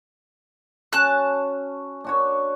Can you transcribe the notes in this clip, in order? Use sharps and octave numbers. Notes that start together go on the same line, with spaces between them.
C#4 F#4 A5 F#6
D4 F#4 C#5